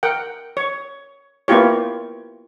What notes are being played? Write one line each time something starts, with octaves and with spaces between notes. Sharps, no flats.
A#4 F#5 G5
C#5
A#3 B3 E4 F4 G4 C#5